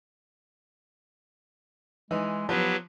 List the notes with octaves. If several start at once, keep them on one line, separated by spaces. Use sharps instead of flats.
E3 G#3 D#4
F3 F#3 B3 G4 B4